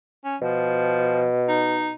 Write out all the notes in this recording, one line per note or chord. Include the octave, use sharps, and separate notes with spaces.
C#4
B2 F3
D#4